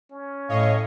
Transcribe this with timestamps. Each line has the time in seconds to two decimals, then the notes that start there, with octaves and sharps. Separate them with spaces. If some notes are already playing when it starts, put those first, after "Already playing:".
0.11 C#4
0.49 A2 C#5 D#5 F5